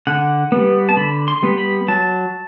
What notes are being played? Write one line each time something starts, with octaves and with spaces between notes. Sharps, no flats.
D3 F#5
G3 B3
A5
D3 B5
C6
G3 B3
B5
F#3 A5